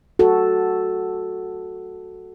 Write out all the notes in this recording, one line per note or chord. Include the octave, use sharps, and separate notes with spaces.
F#4 A4